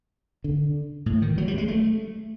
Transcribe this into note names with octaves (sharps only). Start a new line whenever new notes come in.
D3
A2
D#3
F#3
G3
G#3
A3